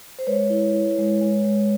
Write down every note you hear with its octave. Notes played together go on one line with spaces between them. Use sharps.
C5
G#3 B4 C#5
E4
E4
G#3
G#3
G#3